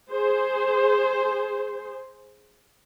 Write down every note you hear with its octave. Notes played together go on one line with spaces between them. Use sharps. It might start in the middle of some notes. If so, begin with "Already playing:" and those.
G#4 C5